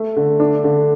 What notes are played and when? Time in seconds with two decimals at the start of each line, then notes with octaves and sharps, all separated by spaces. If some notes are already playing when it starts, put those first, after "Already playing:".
Already playing: A3
0.16 D3
0.40 D4
0.64 D3